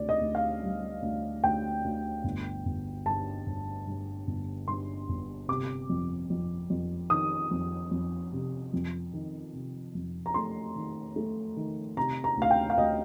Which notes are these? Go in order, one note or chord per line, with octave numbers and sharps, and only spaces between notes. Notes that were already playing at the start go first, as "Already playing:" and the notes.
Already playing: D2 C3 D5
D#5
D2
F5
G3
D2
D2 G5
D2
G1
G1
G2 A5
G1
G2
G1
G2 C6
G1
C3 D6
F2
F2
F2
D#3 D#6
F2
F2
C3
F2
D#3
C3
F2
A#5
A3 C6
D#3
A3
D#3
C3 A#5
A#5
D2 F5
G5
F5
D2 D#5